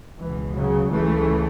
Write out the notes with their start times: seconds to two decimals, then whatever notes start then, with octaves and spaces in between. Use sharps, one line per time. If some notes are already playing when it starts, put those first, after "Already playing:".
0.19 C#2 B2 E3
0.55 C#3 F#3
0.91 C#2 C#3 E3 A3